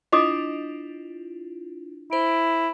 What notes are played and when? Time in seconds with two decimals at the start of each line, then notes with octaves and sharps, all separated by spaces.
0.12 D4 E4 F4 D#5 D6 D#6
2.11 E4 C5 D7